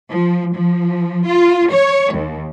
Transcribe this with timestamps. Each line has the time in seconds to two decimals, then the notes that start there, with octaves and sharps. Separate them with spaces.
0.10 F3
0.55 F3
1.26 F4
1.70 C#5
2.13 D#2